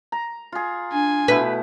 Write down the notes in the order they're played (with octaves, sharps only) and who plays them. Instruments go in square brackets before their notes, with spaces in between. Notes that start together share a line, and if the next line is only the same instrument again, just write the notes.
[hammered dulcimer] A#5
F4 G#4
[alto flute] D4 [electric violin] G#5
[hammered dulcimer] B2 A3 E4 [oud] B4